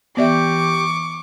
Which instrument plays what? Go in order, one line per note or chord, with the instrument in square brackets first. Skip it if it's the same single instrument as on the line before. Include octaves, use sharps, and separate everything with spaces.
[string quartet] E3 [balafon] B3 D5 E5 [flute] G4 [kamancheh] C#6 D6